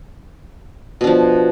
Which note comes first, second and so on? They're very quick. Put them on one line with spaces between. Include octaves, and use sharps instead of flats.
B2 D4 F3